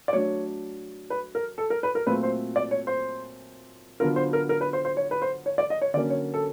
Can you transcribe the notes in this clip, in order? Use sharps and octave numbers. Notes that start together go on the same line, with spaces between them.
D5
F#3 A3 D4 C#5
B4
A#4
A4
A#4
B4
A#4
A#2 F#3 A3 C4 F4 B4
C5
D5
C#5
C5
D3 F#3 B3 D4 F4 A#4
C5
A#4
A#4
B4
C5
C5
C#5
B4
C5
C#5
D5
D#5
C#5
D3 F#3 A#3 C#4 D5
C#5
A4